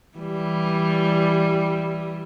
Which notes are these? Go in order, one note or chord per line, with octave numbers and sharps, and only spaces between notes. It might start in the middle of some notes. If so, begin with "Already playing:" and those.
E3 G3